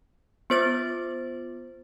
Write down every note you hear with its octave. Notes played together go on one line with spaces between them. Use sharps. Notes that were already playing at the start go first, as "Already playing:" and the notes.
B3 F4 C5 D6 A6